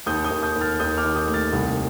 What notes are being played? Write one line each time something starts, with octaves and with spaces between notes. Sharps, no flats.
D#2 D#6 G6
D#6 G6
D#2
D#6 G6
D#2
F6 A6
D#2 D#6 G6
D6 F6
D#2
D#6 G6
A3
F6 A6
C2